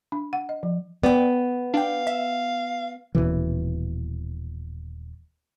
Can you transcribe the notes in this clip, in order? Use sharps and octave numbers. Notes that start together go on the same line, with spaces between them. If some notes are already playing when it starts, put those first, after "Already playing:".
D4
F#5
D#5
F3
B3 D5 G5
D4 F5 G5
E5
D#1 B1 B2 E3